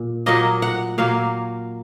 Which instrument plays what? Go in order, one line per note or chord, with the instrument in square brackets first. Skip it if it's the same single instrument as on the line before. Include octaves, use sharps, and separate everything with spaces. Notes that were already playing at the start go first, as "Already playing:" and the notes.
Already playing: [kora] A#2
A#2 F#3 A#3 D#5
F#5
A#2 F#3 A#3 F5